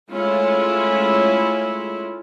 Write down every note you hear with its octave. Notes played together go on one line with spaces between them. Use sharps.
G#3 A3 C#4 E4 F4